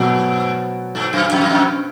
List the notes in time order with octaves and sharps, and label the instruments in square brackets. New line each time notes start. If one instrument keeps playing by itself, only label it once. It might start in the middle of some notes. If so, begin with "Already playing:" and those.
Already playing: [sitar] G2 [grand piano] B2 F#3 B3
[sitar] G2
F#2
F2
F#2
F2